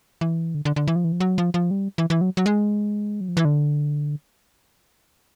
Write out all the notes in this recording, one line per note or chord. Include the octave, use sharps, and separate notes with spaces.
E3
D3
D3
D3
E3
F3
E3
F3
F#3
F3
F3
G3
E3
E3
F#3
F#3
G#3
F#3
F3
E3
D3